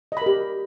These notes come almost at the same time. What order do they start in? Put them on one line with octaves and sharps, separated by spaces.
D#5 B5 A#4 G4